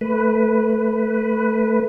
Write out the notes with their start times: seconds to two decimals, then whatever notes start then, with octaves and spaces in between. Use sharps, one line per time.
0.01 A3 B4